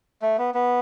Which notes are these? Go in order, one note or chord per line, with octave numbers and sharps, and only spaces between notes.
A3
B3
B3